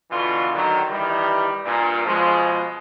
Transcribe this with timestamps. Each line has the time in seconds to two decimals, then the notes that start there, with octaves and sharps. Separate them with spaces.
0.11 B2 D3 E3 B3 F4
0.54 D3 D#3 F#3
0.90 D#3 E3 G3
1.65 G2 A#2
2.05 B2 F3 G#3